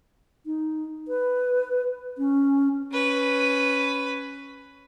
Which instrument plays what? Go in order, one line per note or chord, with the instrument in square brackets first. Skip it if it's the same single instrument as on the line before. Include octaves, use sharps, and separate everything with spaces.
[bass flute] D#4
B4
C#4
[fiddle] C#4 B4